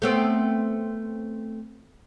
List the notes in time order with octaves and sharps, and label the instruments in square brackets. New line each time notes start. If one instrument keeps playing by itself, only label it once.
[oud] A3 B3 C4